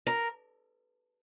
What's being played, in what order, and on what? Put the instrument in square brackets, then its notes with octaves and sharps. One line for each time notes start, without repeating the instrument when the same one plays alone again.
[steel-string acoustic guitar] A#4